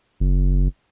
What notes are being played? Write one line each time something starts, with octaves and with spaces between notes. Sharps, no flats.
F#1